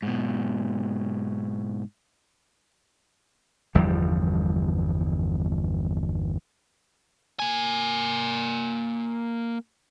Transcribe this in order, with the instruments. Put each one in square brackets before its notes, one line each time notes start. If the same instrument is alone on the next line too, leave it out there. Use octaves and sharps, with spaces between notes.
[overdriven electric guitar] G#2 B2
[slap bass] G1 E2 F3 G3
[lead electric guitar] A#3 G#5